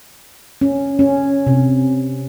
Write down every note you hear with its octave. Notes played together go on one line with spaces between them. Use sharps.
C#4
C#4
C3